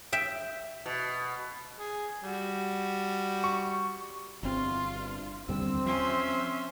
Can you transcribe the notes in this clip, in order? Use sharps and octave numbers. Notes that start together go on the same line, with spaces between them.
E5 G5
B2
G#4
G3 F#4
C#6
G1 E2 B2 C4 F4
C2 G2
D#2 D3 G3 C4 E6
F3 C#4 E5 C6